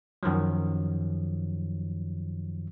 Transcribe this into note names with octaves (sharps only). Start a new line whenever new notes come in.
F#2 D#3 F3 F#3